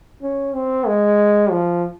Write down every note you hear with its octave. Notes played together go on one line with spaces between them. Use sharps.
C#4
C4
G#3
F3